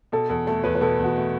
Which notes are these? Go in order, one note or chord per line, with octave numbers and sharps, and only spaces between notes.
B2 A4
E2 A4
A3 A4
E2 B4
B4
B2 A4
E2 F#4
A3